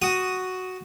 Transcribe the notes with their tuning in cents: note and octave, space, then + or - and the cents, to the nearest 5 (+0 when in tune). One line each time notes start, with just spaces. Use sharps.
F#4 +0 D#6 +0